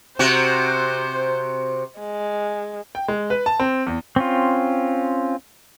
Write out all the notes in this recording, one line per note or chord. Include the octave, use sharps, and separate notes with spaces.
C3 F#4 C5
G#3
G5
G#3
B4
A5
C4
E2
C4 C#4 F4